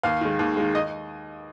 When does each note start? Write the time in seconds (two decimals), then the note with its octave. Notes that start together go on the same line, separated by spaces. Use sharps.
0.03 D#2 F5
0.21 D#3 G#3
0.39 D#2
0.57 D#3 G#3
0.75 D#5